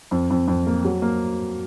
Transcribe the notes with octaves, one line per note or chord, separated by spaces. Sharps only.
F2
F2
F2
A#3
F#3
A#3